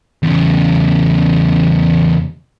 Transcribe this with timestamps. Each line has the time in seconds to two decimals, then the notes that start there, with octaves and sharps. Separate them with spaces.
0.23 E2 C#3